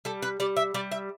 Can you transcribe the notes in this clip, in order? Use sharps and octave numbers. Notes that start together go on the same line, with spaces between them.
G3 A4
B4
G3 D5
E5
G3 D5
E5